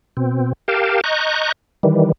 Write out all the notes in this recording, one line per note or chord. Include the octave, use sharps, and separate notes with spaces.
B2 C4
G4 A#4 F5 G5 A5
D#5 A#5 C#6 F#6 G6
D#3 E3 G3